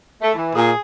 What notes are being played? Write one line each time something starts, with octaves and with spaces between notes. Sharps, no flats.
A3
E3
A#2 G#4